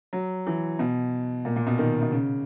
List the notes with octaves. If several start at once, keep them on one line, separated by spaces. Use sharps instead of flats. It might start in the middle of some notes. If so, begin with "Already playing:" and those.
F#3
E3
B2
A#2
A#2
B2
D#3
B2
C#3